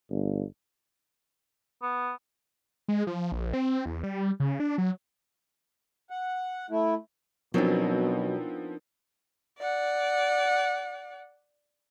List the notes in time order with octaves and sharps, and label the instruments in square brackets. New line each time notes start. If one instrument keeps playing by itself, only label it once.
[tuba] G1
[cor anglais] B3
[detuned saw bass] G#3
F3
A#1
C4
E2
G3
C#3
D4
F#3
[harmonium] F#5
A3 E4
[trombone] B2 [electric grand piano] F3 B3 C4 [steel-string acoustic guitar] F#3 [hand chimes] D4 D#4 A#4
[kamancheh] D5 F#5